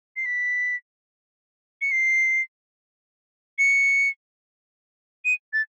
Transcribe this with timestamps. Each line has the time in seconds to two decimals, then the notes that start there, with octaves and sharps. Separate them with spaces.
0.16 C7
0.26 B6
1.82 C#7
1.92 C7
3.59 C#7
5.25 D#7
5.53 A6